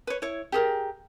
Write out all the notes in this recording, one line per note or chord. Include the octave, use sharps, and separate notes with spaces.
B4 C#5
E4 C#5
G4 G#4 A#4